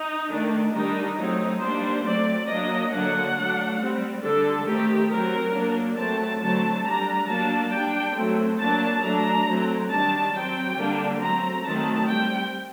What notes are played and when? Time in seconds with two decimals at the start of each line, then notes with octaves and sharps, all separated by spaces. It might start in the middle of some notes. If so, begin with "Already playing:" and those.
Already playing: D#4
0.30 D#3 A3 D4
0.73 D#3 G3 D4 D#4
1.17 F#3 A3 C4 D#4
1.61 G3 A#3 D4 C5
2.04 F#3 A3 C4 D5
2.48 F#3 A#3 D4 D#5
2.91 D3 F#3 A#3 D4 F#5
3.36 F#3 A3 D4
3.79 G3 C4
4.23 D3 G3 D4 A4
4.66 D#3 A3 C4 G4
5.10 F#3 C4 A#4
5.54 F#3 A#3 D4
5.97 F#3 A3 C4 A5
6.41 D3 F#3 A3 C4 A5
6.85 G3 D4 A#5
7.28 F#3 A#3 D4 A5
7.72 G3 D4 G5
8.16 F#3 A3 C4
8.59 F#3 A#3 D4 A5
9.03 F#3 A3 D4 A#5
9.47 F#3 A3 C4
9.90 D#3 G3 D4 A5
10.34 F#3 C4 G5
10.77 D3 G3 A#3 D4
11.21 F#3 A3 C4 A#5
11.64 D#3 F#3 A3 C4 A5
12.08 G3 C4 G5